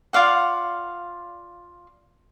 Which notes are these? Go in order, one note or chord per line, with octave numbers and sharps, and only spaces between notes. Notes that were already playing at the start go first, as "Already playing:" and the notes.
F4 D5 F5 F#5